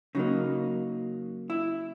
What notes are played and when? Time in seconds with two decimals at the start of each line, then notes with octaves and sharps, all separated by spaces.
0.15 C#3 F#3 A#3 D#4
1.50 E4